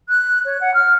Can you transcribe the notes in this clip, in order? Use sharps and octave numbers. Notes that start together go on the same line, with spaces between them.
F#6
C#5
F#5
F6